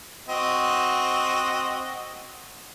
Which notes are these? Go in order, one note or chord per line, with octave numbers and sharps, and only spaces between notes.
C4 F#4 D#5